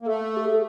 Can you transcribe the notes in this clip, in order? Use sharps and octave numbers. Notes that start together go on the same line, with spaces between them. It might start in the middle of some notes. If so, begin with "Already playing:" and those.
A#3
A3 A4
G4
G#4
A4